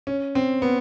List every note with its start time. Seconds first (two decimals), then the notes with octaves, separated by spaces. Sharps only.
0.07 C#4
0.35 C4
0.62 B3